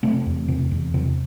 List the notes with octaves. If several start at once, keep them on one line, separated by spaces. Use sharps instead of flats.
C3 A3 C4
E2
C3
E2
C3